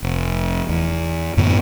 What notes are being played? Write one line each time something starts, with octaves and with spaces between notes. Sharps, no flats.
F1
E2
F#2 A2 D3 B3